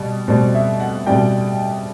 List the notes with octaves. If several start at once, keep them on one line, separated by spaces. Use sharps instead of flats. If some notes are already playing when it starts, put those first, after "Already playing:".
Already playing: B2 G3
B2 G3 C5
E5
F#5
B2 G3 G5